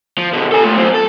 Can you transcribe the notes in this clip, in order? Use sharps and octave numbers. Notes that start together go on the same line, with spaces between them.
F3
B2 D3
A4 G#5
A3 F4
F#2 C4
A4